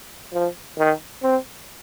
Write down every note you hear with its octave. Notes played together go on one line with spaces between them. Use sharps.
F3
D#3
C4